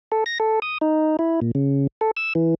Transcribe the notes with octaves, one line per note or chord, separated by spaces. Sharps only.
A4
A#6
A4
D#6
D#4
E4
A#2
C#3
A4
E6
E3